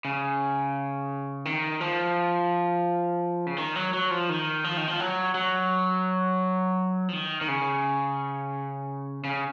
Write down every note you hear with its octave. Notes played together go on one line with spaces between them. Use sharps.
C#3
D#3
F3
C#3
D#3
F#3
F#3
F3
D#3
F3
D#3
F3
F#3
F#3
F3
D#3
D#3
C#3
C#3